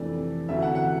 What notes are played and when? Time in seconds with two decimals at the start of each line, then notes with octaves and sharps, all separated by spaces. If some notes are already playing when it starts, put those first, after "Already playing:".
Already playing: F2 C3 E3 A3 D4 D5
0.49 D2 C3 E3 A3 E5
0.62 F#5
0.75 F#5